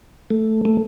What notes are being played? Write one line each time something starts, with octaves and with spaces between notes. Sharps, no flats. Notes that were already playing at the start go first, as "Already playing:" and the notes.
A3
A3